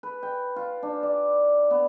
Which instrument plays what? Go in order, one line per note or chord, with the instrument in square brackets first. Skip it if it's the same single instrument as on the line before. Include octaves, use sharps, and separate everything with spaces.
[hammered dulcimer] B4
G5
F4
D4
D5
B3